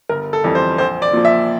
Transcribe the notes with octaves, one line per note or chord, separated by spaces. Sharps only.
G1 A#4
A4
F2 E3 G3
C5
A#1 C5
D5
A#2 F3
E5